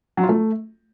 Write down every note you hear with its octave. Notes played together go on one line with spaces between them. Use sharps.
F#3
F4
A3